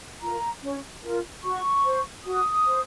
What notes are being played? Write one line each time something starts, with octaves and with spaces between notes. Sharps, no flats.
F4 A#4 A#5
C#4
F4 A#4
F#4 C#6
C5
F#4 D#6
C5